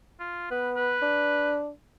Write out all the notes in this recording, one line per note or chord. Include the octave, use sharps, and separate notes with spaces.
F4
B3 B4
B4
D4